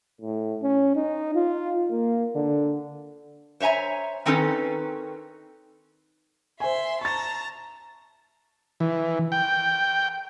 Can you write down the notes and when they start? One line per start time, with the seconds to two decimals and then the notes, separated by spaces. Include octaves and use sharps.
0.21 A2
0.62 C#4
0.95 D#4
1.35 F4
1.91 A#3
2.35 D3
3.60 C5 C#5 E5 G#5 A#5
4.26 D#3 C4 C#4 D#4 A4 B4
6.60 C5 E5 G#5 C6
7.01 A5 A#5 C#6 A6
8.80 E3
9.32 G5